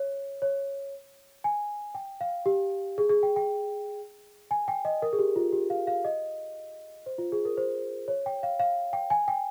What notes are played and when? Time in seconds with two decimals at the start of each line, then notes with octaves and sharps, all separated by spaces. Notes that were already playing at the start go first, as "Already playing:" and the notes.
Already playing: C#5
0.42 C#5
1.44 G#5
1.95 G5
2.21 F5
2.46 G4
2.98 G#4
3.10 G#4
3.23 G5
3.36 G5
4.51 G#5
4.68 G5
4.85 D#5
5.02 A#4
5.13 G#4
5.19 G4
5.36 F4
5.52 G4
5.70 F5
5.87 F5
6.05 D#5
7.06 C5
7.18 F4
7.32 G#4
7.45 A#4
7.57 C5
8.08 C#5
8.26 G5
8.43 F5
8.60 F5
8.93 G5
9.10 G#5
9.28 G5